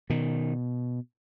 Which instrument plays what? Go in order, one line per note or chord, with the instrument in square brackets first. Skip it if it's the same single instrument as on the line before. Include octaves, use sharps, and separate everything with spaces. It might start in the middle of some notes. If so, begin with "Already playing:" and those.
[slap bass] B2 D#3